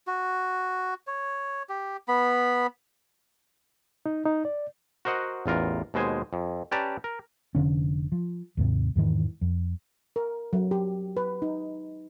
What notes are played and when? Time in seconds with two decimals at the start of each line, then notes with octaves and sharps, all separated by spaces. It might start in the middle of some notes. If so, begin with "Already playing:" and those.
0.07 F#4
1.07 C#5
1.69 G4
2.08 B3 B5
4.06 D#4
4.25 D#4
4.45 D5
5.05 F#4 A#4 C5 D#5 F#5
5.46 A1 E2 F4 A#4
5.94 D#2 B2 G#3 C5 G#5
6.33 F2
6.71 C#4 G4 B4 D5 A5 A#5
7.04 A#4
7.55 F1 B1 D3 C#4
8.12 F3
8.57 D#2 G#2 C3
8.96 E2 G#2 D#3 E3
9.41 F2
10.16 A#4
10.53 F#3
10.71 G4
11.17 B4
11.42 D#4